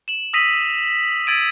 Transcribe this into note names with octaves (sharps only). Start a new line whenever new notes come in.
E7 F#7
D#6 E6 A#6 B6 D#7
E6 G#6 A6 B6 D7 D#7